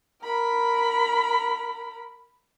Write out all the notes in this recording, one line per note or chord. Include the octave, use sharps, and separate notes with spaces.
A#4 B5